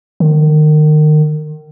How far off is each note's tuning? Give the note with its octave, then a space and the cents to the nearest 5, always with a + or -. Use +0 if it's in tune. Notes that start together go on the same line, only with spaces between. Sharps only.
D#3 -30